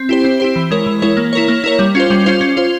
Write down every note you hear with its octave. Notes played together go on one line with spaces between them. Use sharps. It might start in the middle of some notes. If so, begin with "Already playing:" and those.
Already playing: C4
E4 G4 C5
C4
E4 G4 C5
E3
G#3 E4 A#4 C#5
E3
G#3 E4 A#4 C#5
A#3
E4 A#4 C#5
A#3
E4 A#4 C#5
G3
C#4 F4 C5
G3
C#4 F4 C5
C#4
F4 C5